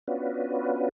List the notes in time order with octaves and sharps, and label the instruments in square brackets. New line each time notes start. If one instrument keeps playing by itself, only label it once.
[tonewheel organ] B3 C#4 D4 F4 F#4 B4